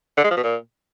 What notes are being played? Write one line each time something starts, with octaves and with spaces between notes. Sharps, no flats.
D3
G#3
F3
B2
A#2